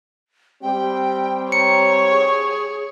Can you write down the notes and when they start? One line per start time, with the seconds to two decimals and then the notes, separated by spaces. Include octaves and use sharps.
0.62 G3 C4 G4 G5
1.52 C#5 A#5 C#7
2.11 G#4